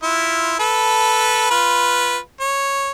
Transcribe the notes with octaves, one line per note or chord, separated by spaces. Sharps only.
E4 F4
A4 B4
F4 B4
C#5